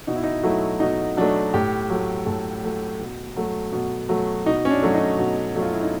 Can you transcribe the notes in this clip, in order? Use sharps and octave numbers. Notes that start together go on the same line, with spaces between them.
B2 D#4
E4
D#4
F#3 A3 E4
B2 D#4
F#3 A3 D4
A2 G4
F#3 A3
A2 A4
F#3 A3
B2
F#3 A3
B2
F#3 A3
B2 D#4
C#4
D4
F#3 A3
D#4
B2
F#3 A3
F4
E4
D#4